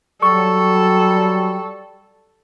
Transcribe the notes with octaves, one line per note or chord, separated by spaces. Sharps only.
F#3 G3 A4 C#6